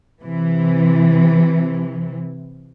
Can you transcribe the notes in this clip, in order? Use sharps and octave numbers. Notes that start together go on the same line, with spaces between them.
C3 E3